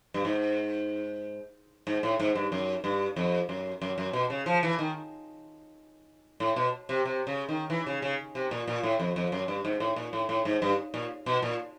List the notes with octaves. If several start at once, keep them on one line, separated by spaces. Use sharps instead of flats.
G2
G#2
G#2
A2
G#2
G2
F#2
G2
F2
F#2
F#2
F#2
B2
C#3
F3
E3
D#3
A2
B2
C3
C3
C#3
D#3
E3
C#3
C#3
C3
A#2
A#2
A2
F2
F2
F#2
G2
G#2
A2
A#2
A2
A2
G#2
G2
A#2
B2
A#2